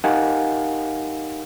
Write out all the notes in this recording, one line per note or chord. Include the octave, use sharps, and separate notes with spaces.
D#4 G4 A#4 F5 F#5 G#5